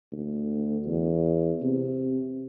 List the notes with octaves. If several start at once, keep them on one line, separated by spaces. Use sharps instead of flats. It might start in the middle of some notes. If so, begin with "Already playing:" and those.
D2
E2
C3